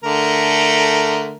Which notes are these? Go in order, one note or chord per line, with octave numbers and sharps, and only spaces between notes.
D3 A3 A#4